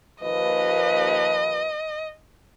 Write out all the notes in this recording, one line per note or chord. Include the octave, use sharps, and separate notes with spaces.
D#2 F3 B4 D#5